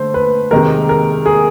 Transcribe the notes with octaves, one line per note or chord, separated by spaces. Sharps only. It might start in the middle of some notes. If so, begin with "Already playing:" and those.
Already playing: D3 A3 C5
B4
C3 D#3 G#3 A#4
A#4
G#4